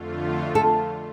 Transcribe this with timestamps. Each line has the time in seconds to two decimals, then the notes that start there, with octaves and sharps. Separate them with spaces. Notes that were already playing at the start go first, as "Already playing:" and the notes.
Already playing: F2 D3 A3 F4
0.55 A4